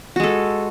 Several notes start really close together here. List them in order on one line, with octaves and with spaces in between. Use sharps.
F#4 G#3 A4